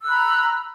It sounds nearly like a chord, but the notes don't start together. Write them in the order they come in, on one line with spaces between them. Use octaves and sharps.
E6 F#6 B5 A#5